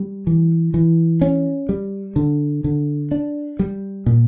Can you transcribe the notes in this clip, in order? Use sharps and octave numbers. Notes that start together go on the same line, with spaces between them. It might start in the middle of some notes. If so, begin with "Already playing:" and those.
Already playing: G3
E3
E3
C#4
G3
D3
D3
D4
G3
A#2